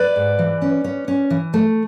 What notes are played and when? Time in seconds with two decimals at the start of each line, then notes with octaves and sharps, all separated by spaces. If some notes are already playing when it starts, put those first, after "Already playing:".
Already playing: B4 D5
0.16 G#2
0.39 E3
0.62 C#4
0.84 C#4
1.08 C#4
1.30 E3
1.54 A3